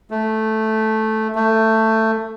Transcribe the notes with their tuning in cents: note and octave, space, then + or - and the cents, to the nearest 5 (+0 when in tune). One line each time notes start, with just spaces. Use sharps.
A3 -5
A3 +15